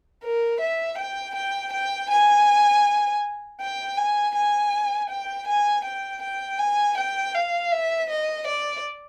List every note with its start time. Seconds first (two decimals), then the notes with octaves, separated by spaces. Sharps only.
0.23 A#4
0.61 E5
0.98 G5
1.36 G5
1.73 G5
2.10 G#5
3.60 G5
3.97 G#5
4.35 G#5
5.10 G5
5.48 G#5
5.85 G5
6.22 G5
6.59 G#5
6.98 G5
7.35 F5
7.72 E5
8.10 D#5
8.47 D5